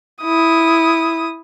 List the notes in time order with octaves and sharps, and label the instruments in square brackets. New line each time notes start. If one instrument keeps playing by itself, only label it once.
[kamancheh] E4 D#6